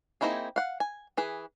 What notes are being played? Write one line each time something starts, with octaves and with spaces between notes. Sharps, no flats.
A#3 C4 D#4 E4 G#4
F5 F#5
G#5
E3 G#4 B4